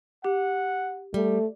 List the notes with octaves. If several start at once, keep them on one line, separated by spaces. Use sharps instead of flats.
G4 F#5
G3 A3